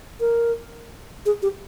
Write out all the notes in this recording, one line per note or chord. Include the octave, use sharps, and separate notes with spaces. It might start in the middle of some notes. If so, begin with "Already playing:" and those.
A#4
G#4
G4